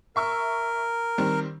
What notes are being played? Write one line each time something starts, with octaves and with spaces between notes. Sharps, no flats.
A#4 E5 C#6 E6
D#3 G3 C4